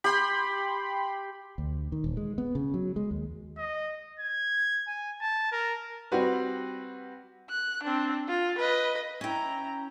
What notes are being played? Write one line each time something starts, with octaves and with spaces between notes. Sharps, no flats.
G4 B5 C6
D2
D#3
D#1
G#3
B3
C#3
F#3
G#3
D#2
D#5
G#6
G#5
A5
A#4
G3 C4 F#4 B4
F#6
C4 D4
F4
B4 D#5
C#4 E4 G5 A#5